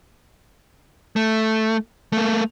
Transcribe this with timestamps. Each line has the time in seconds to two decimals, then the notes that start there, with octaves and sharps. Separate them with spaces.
1.16 A3
2.13 A3 A#3